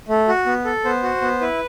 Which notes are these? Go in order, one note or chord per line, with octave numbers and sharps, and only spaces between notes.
A3
F#4
B3
A4
B3 C5
F#4
B3
E4 B4